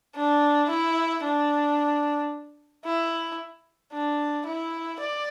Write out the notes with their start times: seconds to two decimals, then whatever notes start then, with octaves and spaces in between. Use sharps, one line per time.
0.16 D4
0.70 E4
1.24 D4
2.85 E4
3.93 D4
4.46 E4
5.00 D5